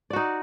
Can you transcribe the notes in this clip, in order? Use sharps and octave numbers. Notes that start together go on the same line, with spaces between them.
D#4 F#4 D5